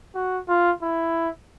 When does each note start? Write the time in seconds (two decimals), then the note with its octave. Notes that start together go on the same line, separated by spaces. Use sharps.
0.15 F#4
0.48 F4
0.82 E4